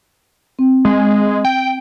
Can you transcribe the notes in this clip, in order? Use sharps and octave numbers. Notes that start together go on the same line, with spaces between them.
C4
G#3
G5